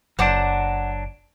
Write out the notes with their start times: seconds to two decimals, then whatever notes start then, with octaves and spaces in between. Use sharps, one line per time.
0.19 F#1 F#3 D4 C5 F#5 D6